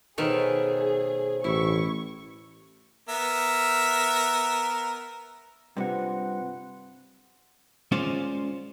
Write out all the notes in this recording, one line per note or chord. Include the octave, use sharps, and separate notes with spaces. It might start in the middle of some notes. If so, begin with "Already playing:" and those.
B2 D#3 A3 G#4 C5 C#5
A1 E4 C#6
B3 A#4 E5
G2 C3 F4 B4 F#5
G#3 C#4 F4 C5 D5